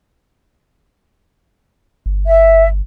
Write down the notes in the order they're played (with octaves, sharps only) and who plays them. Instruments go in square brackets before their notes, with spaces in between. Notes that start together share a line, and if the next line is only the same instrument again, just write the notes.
[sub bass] G1
[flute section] E5